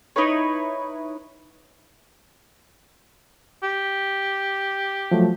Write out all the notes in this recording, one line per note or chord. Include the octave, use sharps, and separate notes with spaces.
D#4 E4 B4 C#5
G4
F3 F#3 A3